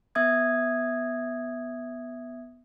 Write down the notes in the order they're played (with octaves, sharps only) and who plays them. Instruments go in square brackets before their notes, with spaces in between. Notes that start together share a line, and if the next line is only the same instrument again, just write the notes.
[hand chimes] B3 E5 D#6 G#6